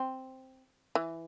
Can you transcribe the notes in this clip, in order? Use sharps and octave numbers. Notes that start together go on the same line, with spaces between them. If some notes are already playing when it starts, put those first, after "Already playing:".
Already playing: C4
E3